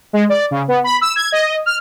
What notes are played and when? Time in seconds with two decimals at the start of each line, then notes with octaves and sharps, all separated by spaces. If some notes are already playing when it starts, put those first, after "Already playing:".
0.13 G#3
0.29 D5
0.51 C#3
0.68 B3
0.84 B5
1.01 E6
1.16 G#6
1.32 D#5
1.66 F6